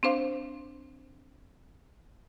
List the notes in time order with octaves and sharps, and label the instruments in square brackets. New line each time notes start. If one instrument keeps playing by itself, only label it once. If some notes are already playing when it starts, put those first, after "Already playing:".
[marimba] C4 D4 C5 F5